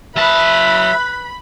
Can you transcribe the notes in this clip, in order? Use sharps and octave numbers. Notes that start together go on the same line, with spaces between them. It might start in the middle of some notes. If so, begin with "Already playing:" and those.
F#3 B4 E5 A5 B5